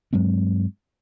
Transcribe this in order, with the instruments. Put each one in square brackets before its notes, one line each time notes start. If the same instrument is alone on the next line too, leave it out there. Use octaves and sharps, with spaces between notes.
[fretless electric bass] G2 F#3 G#3 C4